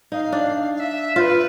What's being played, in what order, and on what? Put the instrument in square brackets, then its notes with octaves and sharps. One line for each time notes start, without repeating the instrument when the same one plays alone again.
[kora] D#4 [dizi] F5
[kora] D4
[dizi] F5
E5
[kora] F4 [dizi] C5
[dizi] B4